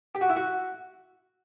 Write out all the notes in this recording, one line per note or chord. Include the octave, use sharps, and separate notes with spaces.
G4
F#4
E4
F#4